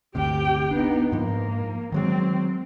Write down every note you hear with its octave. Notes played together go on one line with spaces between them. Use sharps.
G1 D2 C3 G4 G5
B3 D4 D#4
G#2 F3 A#3
D#3 F#3 G#3 C4